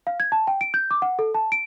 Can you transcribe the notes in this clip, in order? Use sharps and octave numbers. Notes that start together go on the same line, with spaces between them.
F5
G#6
A5
G5
D7
G6
D6
F#5
A4
A5
D7